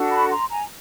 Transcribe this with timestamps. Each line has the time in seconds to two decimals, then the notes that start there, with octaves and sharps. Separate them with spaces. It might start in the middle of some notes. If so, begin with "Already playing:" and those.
Already playing: D4 F#4 A4
0.10 A5 B5
0.30 A#5 C6
0.50 G#5 A#5